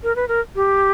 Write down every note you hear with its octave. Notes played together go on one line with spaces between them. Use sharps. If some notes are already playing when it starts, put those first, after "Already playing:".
A#4
B4
A#4
G4